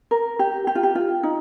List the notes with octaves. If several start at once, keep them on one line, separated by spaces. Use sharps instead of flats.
A#4
G4
G4
F4
G4
F4
D#4